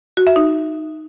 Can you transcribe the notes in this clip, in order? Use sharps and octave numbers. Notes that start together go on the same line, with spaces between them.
F#4
E5
D#4